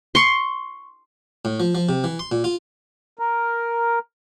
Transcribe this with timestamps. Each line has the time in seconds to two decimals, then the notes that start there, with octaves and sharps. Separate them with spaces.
0.15 C6 C#6
1.45 A2
1.60 F3
1.75 F3
1.89 C3
2.04 E3
2.19 C6
2.32 A#2
2.44 F4
3.19 A#4